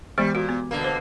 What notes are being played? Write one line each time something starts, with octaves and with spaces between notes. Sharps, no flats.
E3 G3 G#3 B3
A#2 F#4
B3
B2 D3 A#3
C5